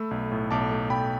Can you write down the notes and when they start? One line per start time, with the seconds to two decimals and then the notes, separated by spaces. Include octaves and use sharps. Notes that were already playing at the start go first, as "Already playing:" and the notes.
Already playing: A3 B5 E6
0.11 B1
0.32 A2
0.51 B1 A5 D6
0.71 A3
0.90 B1 G5 B5